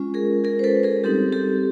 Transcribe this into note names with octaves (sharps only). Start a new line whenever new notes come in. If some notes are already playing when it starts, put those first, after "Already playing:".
Already playing: G#3 C#4 F4
G#4 A#4
G#4 A#4
C5
A4 B4
G#4 A#4
G3 C4 D#4 G4 A4
G4 A4